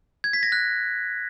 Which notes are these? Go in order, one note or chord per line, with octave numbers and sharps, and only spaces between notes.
G#6
B6
A#6
F#6